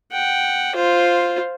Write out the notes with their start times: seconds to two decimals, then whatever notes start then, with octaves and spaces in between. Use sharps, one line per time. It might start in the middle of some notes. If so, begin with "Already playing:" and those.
0.11 F#5 G5
0.75 F4 C5